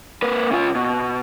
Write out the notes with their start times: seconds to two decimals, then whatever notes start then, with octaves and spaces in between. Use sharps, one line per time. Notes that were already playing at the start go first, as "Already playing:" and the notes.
0.22 A#3 B4
0.51 C#3 F4
0.75 B2